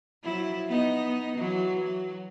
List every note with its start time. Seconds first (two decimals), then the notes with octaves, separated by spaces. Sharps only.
0.23 F3 F#3 E4
0.68 B3 D#4 D#5
1.37 E3 F#3
1.84 F#3